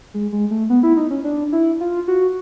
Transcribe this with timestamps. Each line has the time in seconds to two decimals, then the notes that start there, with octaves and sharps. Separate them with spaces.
0.14 G#3
0.32 G#3
0.51 A3
0.70 B3
0.83 E4
0.97 D#4
1.11 C#4
1.24 D4
1.52 E4
1.80 F4
2.08 F#4